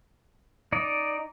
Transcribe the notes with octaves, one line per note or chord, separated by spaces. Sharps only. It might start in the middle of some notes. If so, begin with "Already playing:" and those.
D#4 D5